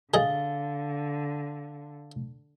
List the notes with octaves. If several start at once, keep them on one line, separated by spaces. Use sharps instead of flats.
D3 G#4 D#5 F5 A6 G7